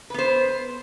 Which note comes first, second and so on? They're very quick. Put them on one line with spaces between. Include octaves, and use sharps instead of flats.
B4 B3 C5